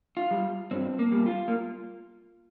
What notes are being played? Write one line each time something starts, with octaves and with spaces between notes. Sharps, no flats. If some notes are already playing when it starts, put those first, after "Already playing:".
F4
G3
G2 C4
A#3
G3
F4
A#3